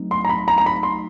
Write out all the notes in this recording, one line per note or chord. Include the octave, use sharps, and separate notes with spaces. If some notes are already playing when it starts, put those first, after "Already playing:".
Already playing: F#3 A3 C4 D#4
C6
A#5
B5
A#5
A#5
B5
C6